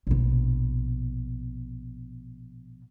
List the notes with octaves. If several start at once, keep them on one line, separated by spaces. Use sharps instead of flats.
A#1 B2